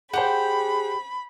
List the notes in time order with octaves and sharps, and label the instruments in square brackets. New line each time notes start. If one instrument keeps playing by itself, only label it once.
[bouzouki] G4 G5 [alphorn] G#4 [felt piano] C5 F#5 [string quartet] B5